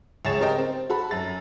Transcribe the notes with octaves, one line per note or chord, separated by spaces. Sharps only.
C#2 G#4 C#5 A6 E7
C4 G4 A#4 C5 D#5 G5
C4
F#4 A4 B5
F#2 A6